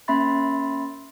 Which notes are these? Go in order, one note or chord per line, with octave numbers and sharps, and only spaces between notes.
A#3 C#4 E5 B5 C6 A6